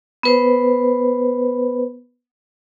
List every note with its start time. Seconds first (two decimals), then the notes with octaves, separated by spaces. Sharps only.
0.23 B3 B4 C5